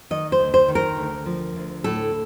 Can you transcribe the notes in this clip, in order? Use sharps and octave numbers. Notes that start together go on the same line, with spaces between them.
D#3 D#5
C5
D2
C5
D#3
A#4
D2
F3
D2
A2 A4